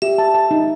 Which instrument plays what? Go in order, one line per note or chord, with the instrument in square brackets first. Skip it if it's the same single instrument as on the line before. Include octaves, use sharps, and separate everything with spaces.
[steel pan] G4 [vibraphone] E5
[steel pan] A5
A5
D#4